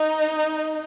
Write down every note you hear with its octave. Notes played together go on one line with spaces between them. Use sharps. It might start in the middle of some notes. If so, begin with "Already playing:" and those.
Already playing: D#4